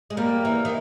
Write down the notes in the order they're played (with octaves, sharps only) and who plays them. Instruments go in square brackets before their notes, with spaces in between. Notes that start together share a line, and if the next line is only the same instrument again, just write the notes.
[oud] G#3
[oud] G3 [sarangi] A#3
[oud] E3
D#3